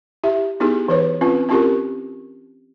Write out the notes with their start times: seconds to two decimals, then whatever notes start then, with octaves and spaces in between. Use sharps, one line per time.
0.24 E4 G4 E5
0.60 B3 D#4 E4 G4 G#4
0.88 E3 B4 C#5
1.21 C4 C#4 F4 B4
1.49 C4 C#4 E4 F4 G4 A#4